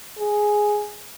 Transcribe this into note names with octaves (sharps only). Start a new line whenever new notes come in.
G#4